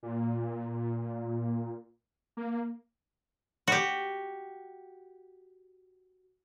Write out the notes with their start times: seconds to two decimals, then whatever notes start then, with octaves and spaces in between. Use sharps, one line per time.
0.03 A#2
2.37 A#3
3.68 F#4 G4